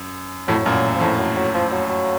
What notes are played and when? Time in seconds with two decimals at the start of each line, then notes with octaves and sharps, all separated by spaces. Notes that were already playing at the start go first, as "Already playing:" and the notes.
Already playing: F#2
0.47 F2 A2 F#3
0.66 F#2 A#2
0.71 F#3
0.95 F3
1.00 F2 A2
1.18 F#3
1.36 F#3
1.54 F3
1.72 F#3
1.90 F#3